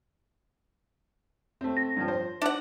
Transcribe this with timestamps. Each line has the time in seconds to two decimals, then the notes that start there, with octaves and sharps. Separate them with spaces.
1.61 A3 C4
1.77 A#6
1.96 G2 F3
2.08 C5
2.42 D4 F#5